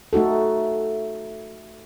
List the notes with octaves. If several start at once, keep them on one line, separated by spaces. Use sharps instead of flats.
A3 D#4 F#4 A4